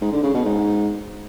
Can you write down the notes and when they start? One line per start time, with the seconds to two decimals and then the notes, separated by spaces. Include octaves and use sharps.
0.01 G#2
0.12 D3
0.23 C#3
0.34 B2
0.45 G#2